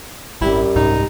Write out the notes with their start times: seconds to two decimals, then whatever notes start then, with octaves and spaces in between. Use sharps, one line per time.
0.41 G#1 F#2 G3 E4
0.76 C2 G#2 D#4